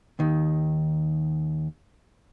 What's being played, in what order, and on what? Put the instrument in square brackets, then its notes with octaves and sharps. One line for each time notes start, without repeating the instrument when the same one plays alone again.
[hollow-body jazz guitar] D#2 D#3